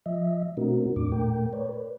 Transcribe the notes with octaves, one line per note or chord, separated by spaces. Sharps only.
F3 D#5 E5
B2 A3 C4 D4 F#4 A#4
E2 A2 D4 D6
A#2 A3 A#4 G5
A#4 B4 C#5 D5
B4